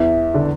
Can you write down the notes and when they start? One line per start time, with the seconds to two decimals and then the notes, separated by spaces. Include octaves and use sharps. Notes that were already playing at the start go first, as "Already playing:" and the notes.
Already playing: E2 E3 E5
0.34 D3